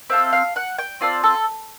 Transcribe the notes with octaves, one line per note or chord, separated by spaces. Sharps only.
C4 F4 A4 E5
F5
F#5
G5
C4 F4 A4 D5
A4